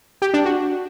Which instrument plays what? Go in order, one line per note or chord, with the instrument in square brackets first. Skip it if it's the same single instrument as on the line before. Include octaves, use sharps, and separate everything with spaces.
[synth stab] G4
D4
F#4